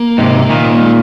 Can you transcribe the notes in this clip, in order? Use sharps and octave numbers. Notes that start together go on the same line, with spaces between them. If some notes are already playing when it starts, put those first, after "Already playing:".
Already playing: A#3
G#2 C3
A#2 D#3
G#3